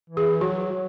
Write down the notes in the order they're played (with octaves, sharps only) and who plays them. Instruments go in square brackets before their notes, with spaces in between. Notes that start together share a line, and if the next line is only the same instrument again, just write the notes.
[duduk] E3
[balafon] G#4
[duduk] F#3 [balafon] F#4
[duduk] F#3